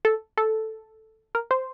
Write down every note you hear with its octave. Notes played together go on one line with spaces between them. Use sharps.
A4
A4
A#4
C5